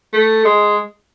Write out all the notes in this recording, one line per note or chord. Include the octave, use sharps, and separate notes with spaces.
A3
G#3